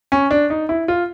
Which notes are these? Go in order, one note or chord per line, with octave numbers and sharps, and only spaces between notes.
C#4
D4
D#4
E4
F4